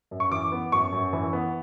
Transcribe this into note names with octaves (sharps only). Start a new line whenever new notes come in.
F#2
C#6
E3 D6
B3
F#2 C#6
F#2
E3
B3